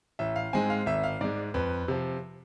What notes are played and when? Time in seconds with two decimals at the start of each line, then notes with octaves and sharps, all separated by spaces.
0.19 A1 E5
0.36 F5
0.53 G#2 G#3 C4 G#5
0.70 F5
0.86 G#1 E5
1.04 F5
1.21 G#2 G#3 D5
1.54 F2 B4
1.88 C3 F3